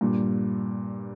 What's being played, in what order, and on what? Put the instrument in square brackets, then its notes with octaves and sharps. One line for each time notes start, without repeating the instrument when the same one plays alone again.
[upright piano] G2 A#2